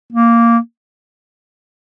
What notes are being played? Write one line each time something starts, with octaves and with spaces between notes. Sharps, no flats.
A#3